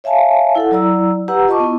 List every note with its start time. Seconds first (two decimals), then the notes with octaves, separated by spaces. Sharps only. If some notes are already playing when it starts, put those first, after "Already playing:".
0.04 C#5 E5 F5 G#5 A5
0.55 E4 A4 F#5
0.71 F#3 E4 D5 A#5 E6
1.28 G4 B4 F#5 A#5 E6
1.48 F4 D#5 A5 C#6 D6
1.60 B3 E4